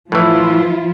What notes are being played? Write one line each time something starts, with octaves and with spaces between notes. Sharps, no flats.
A2 E3 F3 E4 F4